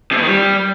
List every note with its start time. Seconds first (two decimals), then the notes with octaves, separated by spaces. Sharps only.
0.12 C3
0.17 B2
0.22 D#3
0.27 G3